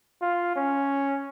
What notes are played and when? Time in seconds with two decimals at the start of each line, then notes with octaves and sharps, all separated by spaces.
0.22 F4
0.56 C#4